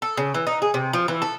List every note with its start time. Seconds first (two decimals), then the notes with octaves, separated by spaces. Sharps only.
0.02 A4
0.17 C#3
0.34 E3
0.47 D#4
0.62 G#4
0.74 C3
0.93 F3
1.08 E3
1.22 A4